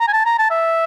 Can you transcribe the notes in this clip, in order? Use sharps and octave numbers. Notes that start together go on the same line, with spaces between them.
A#5
G#5
A5
A#5
A5
E5